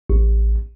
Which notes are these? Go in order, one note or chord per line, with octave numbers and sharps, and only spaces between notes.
A1